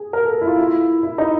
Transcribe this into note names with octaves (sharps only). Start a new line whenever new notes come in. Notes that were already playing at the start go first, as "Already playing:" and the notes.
Already playing: G#4
A#4
A4
E4
F4
E4
E4
D#4